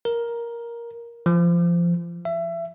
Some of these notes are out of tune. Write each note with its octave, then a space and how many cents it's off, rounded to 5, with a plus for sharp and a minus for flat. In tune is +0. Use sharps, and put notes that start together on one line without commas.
A#4 +10
F3 -20
E5 +25